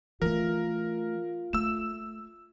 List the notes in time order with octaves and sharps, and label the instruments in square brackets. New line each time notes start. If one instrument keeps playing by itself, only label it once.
[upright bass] E3 A3 [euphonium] F4 [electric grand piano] A#4
[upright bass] A3 [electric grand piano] E6 E7